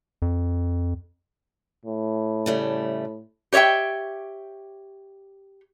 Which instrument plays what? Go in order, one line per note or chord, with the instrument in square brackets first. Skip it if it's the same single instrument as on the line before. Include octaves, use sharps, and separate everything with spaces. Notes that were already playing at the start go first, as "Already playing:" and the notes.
[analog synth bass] F2
[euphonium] A2
[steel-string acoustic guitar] C#3 G3 A3
[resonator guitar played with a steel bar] G4 C#5 D5 E5 G5